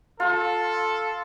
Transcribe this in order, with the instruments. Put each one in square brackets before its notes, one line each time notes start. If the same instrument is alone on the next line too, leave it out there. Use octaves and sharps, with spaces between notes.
[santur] F4 [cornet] A4